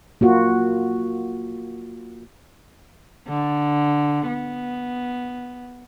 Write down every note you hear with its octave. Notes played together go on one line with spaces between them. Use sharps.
A#3 F4 F#4
D3
B3